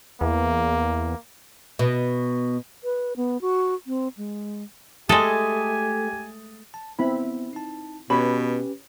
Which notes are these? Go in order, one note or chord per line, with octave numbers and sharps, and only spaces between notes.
E2 A#3
B2
B4
B3
F#4
C4
G#3
G#3 A3 G4 A4 G#5 D#6 A6
A5
B3 C4 E4 B5
D#4 A5
B2 C#4 G4 B4 C#5 B5